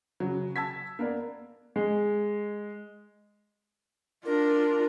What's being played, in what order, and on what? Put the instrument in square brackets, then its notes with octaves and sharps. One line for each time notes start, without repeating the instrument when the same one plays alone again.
[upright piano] C#3 F#3
A5 E6 G#6 B6
A#3 B3 A#4 D5
[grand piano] G#3
[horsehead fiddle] D4 F4 [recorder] A#4